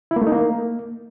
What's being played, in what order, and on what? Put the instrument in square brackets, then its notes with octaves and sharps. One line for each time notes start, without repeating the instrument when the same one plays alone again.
[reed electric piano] E4
A#3
A3
D#4
A#3